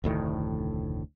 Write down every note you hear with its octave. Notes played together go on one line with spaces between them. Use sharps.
F1 D2 A2 D#3